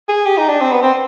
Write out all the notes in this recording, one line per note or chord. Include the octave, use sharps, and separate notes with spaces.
G#4
G4
D#4
D4
C4
B3
C4